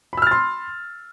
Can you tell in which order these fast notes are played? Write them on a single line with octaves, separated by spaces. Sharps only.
B5 E6 F6 A6 C6